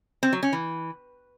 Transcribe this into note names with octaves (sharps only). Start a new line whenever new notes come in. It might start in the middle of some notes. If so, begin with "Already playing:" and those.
C4
F#3
C#4
E3